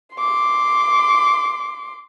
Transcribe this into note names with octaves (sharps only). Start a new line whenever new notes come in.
C6 D6